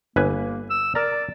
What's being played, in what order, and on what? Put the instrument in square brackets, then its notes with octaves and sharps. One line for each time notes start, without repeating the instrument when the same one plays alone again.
[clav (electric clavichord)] G1 B4 G#5 [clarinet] A#3
[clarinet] E6
[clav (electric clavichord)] A#4 A#5 [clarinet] D5